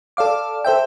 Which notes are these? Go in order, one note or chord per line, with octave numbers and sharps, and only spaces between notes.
A4 D5 F5 D6
A4 C5 E5 G5